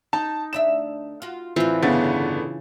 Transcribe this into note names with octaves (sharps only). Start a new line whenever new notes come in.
D#4 A5
D2 D4 E5 E7
F4 F#4
A2 D3 E3 C4 F4
G1 C#3 B3 A6